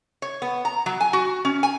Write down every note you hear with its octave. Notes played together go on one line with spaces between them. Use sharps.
C#5
B3
A#5
F#3
G#5
F#4
C#4
G#5